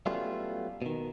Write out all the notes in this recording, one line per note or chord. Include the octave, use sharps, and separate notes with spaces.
F#3 G3 A3 B3 C#4 F4
B2 D#3